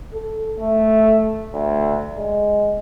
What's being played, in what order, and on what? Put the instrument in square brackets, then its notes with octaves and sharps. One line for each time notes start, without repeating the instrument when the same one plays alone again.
[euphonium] A4
A3
D2
G#3